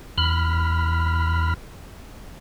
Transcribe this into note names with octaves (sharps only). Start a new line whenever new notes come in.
E2 B5 F6